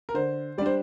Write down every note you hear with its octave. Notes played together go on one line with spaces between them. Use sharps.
A#4
D3 C5
G3 D4 C5 D5